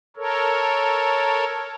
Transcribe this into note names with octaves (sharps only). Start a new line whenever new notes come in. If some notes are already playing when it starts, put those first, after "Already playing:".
A4 A#4 C#5